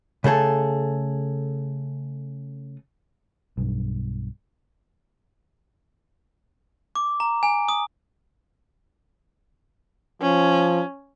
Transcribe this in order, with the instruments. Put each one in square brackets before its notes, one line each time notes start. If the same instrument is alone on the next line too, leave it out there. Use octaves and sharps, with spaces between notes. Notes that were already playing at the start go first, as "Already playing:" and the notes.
[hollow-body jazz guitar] C#3 A3 G#4 A4
[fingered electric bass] B1 G2
[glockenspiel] D6
A#5
G#5
D#6
[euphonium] F3 [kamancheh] C#4